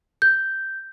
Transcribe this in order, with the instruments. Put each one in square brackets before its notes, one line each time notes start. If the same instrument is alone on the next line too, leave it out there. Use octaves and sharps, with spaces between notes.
[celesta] G6